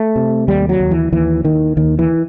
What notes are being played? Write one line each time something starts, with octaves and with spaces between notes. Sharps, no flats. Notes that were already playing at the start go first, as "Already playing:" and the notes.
Already playing: A3
C3
D#2 G3
F#3
D#2
E3
D#2 E3
D#2 D#3
D#2 D#3
E3